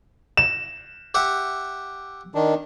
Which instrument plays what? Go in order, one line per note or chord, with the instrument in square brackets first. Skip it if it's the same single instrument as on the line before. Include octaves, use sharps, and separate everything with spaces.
[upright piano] E7
[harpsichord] G4 E5 F#5
[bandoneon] D#3 D4